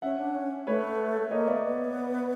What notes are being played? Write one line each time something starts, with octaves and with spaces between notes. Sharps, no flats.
C#4 E5 F#5
D4
C#4
A3 B4 C#5
A3
A#3 C#5 D#5
B3 D5 E5
B3